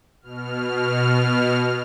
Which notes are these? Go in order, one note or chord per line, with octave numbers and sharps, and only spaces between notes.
B2 F6